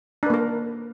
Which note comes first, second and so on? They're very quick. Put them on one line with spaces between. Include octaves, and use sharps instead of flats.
D4 B4 A#3 A#4